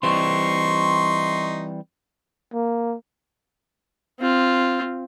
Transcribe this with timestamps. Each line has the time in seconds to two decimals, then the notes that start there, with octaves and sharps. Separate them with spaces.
0.03 E3 G3 C4 D#4 C6 C#6
2.54 A#3
4.19 C4 F4